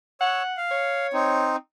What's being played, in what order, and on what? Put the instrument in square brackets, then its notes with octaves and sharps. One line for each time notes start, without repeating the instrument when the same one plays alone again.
[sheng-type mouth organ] C#5 E6 [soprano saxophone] F#5
[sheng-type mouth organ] F5
[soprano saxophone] C#5
[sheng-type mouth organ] C4 D#4